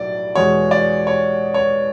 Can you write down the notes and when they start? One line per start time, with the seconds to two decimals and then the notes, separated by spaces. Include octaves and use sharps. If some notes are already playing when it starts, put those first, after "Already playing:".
Already playing: B1 A2 F#3 D5
0.35 E2 B2 G#3 C#5
0.71 D5
1.07 C#5
1.54 C#5